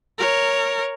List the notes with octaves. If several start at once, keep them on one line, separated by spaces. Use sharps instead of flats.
A#4 C#5